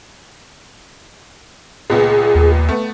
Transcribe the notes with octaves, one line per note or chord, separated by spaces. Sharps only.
C#2 A#2 B3 G#4
D#2
A3 B3